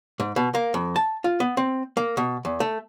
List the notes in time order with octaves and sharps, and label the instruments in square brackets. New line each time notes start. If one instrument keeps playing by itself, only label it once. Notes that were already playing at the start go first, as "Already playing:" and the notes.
[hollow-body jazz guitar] G#2
B2
A#3
F2
A5
F4
B3
C4
A#3
B2
E2
A3